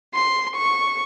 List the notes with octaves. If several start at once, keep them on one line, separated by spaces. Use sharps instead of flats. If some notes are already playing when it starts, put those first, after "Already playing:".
C6
C#6